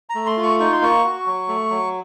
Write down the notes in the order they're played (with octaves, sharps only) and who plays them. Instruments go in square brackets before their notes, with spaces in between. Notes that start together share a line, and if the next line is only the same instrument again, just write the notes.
[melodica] A#5
A3
C6
F4
C#6
D#4 C#6
C6
A#3 C#6
F#4
F#3
A3
F#3